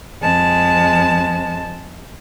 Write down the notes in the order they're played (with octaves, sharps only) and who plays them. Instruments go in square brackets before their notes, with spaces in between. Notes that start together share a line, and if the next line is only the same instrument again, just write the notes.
[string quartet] F2 G#3 A5